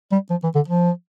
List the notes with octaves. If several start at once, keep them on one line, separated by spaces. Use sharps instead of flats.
G3
F3
E3
D3
F3